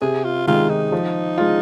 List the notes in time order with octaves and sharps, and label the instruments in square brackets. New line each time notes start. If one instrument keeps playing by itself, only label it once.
[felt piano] C3 [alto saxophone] G#4
[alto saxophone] F4
[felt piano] D#3 G#3 [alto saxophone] F4
[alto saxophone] D#4
[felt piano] F3
G#3 F4